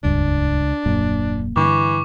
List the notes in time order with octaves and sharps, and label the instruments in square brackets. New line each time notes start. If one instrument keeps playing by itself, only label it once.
[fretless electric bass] D#1 G2 [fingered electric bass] C#2 [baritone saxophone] D4
[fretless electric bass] D#1 F#2 A#2 [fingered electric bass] A#3
[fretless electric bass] G2 D3 [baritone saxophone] E3 [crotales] C#6 D6